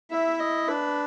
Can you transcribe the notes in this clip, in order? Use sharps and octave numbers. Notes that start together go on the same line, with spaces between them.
E4 E5
D#5
D4 B4